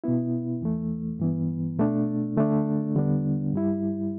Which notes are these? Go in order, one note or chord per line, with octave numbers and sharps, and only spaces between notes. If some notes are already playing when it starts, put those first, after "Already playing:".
B2 B3 E4
E2 E3 A3
G2 E3 B3
B2 A3 D4
D3 A3 D4
E2 D3 G3 B3 D4
G2 G3 E4